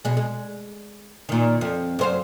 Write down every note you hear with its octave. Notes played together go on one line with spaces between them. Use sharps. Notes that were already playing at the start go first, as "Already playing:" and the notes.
B2 G#3
G#3
A#2 D#3
F2
F#2 C5 F5